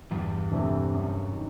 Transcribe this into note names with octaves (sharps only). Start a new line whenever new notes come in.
E2 G2
C3 E3 A3 D4
F#2
D#3